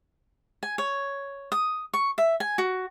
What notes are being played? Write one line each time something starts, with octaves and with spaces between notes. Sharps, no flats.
G#5
C#5
D#6
C#6
E5
G#5
F#4